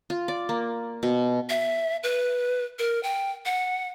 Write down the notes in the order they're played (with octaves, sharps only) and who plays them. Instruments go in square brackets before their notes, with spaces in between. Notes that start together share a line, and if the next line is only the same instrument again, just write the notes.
[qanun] F4
D5
A#3
B2
[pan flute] E5
B4
A#4
G5
F#5